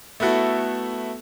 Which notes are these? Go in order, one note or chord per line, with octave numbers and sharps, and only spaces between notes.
A3 B3 E4 F#4 A4